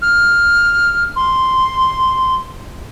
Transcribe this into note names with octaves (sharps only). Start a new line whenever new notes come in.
F6
C6